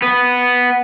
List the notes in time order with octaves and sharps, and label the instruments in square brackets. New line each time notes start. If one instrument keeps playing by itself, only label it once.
[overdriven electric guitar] B3